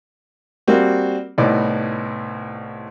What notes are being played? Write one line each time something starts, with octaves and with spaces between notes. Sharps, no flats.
G3 A#3 C4 F#4
C2 A2 B3 D#4 D5